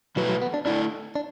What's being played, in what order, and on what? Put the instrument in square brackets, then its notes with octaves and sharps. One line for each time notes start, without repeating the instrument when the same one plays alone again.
[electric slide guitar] B2 A3 E4 B4 [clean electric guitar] F#3
[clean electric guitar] F#3
B3
D4
[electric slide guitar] D3 A3 E4 [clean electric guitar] D4
[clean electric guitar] D4